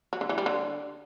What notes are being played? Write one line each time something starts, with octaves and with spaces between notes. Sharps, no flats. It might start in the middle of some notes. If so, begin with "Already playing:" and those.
F#3
D3
E3
G3
D3